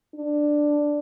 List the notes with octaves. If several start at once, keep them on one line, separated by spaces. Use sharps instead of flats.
D4